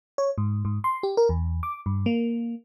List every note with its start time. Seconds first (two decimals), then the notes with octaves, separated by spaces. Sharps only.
0.18 C#5
0.38 G#2
0.65 G#2
0.84 C6
1.03 G4
1.17 A#4
1.29 E2
1.63 D6
1.86 G2
2.06 A#3